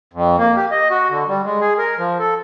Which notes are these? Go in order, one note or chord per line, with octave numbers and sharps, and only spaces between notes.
F2
A#3
G4
D#5
F#4
D3
G3
G#3
G#4
A#4
F3
A4